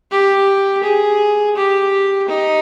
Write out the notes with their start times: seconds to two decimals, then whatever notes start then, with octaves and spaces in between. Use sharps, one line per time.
0.11 G4
0.84 G#4
1.56 G4
2.28 D#4